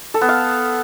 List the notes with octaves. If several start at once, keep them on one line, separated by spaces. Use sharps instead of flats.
A4
B3
F5